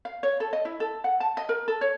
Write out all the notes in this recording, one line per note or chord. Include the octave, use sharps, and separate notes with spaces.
F5
C#5
A4
D#5
E4
A4
F#5
A5
D#5
A#4
A4
C#5